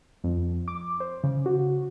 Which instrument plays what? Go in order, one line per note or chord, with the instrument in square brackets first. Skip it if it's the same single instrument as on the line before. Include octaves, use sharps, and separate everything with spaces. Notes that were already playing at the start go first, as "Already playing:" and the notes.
[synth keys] F2
D6
C5
C#3
F#4